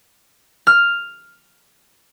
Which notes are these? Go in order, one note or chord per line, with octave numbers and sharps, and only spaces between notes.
F6